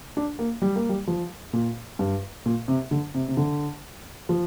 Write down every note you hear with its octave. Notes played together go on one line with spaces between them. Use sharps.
D4
A#3
G3
A#3
G3
F3
A#2
G2
A#2
C3
D3
C3
C3
D3
F3